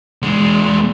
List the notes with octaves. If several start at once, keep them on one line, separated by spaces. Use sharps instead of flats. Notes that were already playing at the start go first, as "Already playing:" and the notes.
E2 G#3